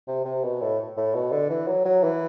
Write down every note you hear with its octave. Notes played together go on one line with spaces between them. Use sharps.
C3
C3
B2
A2
A2
B2
D3
E3
F#3
F#3
E3